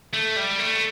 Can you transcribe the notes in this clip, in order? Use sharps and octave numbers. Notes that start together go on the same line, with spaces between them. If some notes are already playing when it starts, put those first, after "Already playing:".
A3
G3
A3